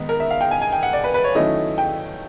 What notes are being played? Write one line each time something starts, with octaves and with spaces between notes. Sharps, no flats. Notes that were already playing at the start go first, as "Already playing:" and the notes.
Already playing: D#3 G#3 B3 D#4
A#4
E5
F5
G5
G#5
G#5
G5
F#5
D5
B4
B4
C#5
D#3 F#3 A3 C#4 E4 D#5
G5